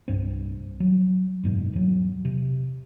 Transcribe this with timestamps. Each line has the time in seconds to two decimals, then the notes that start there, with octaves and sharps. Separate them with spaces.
0.08 C2 G2 C4
0.80 F#3
1.44 F#1 G#2 B2
1.73 E2 F#3
2.25 C3